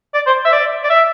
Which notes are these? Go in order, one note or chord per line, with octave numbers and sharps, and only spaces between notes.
D5
C5
E5
D5
D5
E5